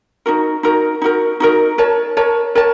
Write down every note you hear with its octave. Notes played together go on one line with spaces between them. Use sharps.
D#4 F#4 A#4
D#4 F#4 A#4
D#4 F#4 A#4
D#4 F#4 A#4
A#4 C#5 A5
A#4 C#5 A5
A#4 C#5 A5